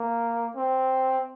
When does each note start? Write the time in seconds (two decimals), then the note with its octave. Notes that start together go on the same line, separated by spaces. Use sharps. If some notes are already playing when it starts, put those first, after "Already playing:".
Already playing: A#3
0.56 C4